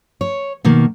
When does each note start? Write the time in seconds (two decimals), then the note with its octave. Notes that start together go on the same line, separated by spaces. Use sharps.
0.21 C#5
0.65 B2 D#3 A#3